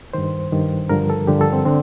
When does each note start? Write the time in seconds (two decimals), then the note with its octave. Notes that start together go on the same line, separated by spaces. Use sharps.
0.13 G2 D#3 C5
0.52 G2 D#3
0.89 G2 D3 F3 A#4
1.10 A4
1.27 G2 D3 F3 G4
1.41 A4
1.53 C4
1.65 D3 C4